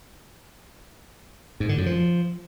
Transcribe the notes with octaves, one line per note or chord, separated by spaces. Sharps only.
G#2
D3
F#2
F3